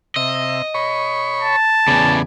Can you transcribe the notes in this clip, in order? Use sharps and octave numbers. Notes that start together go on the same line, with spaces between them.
C3 D#5 E5
C#5 B5 C#6
A5
E2 C#3 B3 D5 G#5